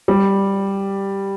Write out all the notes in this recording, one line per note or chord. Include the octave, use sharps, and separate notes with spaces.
G3